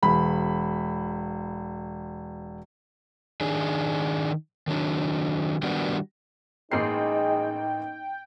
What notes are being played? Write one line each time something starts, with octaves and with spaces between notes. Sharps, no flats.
E1 B5
D#3 D4 G#4
D#3 F#3 D4
D#3 G3 B3 D4 F#4 A#4
A1 G#3 A#3 D#4 G5 C7